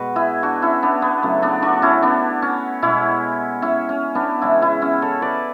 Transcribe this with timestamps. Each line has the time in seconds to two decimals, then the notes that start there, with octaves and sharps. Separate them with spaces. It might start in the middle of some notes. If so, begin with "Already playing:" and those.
Already playing: B2 G#3 F#4 B4
0.16 E4 G#4
0.43 D4 F#4
0.62 C#4 E4
0.82 B3 D4
1.02 B3
1.23 C#3 F#3 A3
1.42 B3 D4
1.62 D4 F#4
1.82 C#4 E4
2.02 B3 D4
2.42 C#4
2.82 B2 G#3 C#4 E4
3.62 C#4 E4
3.89 C#4
4.15 B3 D4
4.42 C#3 E3 G#3 C#4 E4
4.62 E4 G#4
4.82 C#4 E4
5.02 A4 C#5
5.22 B4 D5